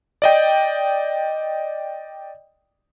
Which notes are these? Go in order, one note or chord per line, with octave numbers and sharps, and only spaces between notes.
D5 D#5 G5